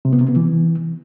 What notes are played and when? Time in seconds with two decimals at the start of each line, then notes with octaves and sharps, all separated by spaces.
0.05 C3
0.13 B3
0.21 C3
0.28 B3
0.36 E3